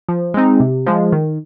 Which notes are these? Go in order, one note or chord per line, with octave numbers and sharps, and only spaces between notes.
F3
G#3 C4 D#4
C3
F3 G#3
D#3